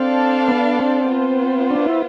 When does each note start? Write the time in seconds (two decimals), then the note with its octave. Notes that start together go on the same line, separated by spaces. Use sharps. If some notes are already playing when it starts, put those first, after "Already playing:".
Already playing: C4 D4 A4 D5 F5 A5
0.48 B3
0.79 C4
1.09 B3 F4 C5
1.71 D4
1.86 E4